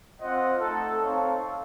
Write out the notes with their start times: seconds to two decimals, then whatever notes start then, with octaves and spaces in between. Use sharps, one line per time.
0.21 C4 F4 C5 D#5 F#5
0.61 A3 D#4 A4
1.01 C4 D#4 A4 C#5 F5